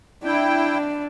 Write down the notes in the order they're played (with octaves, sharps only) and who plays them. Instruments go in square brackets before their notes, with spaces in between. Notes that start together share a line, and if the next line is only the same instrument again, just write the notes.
[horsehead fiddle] D4 [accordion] E4 G5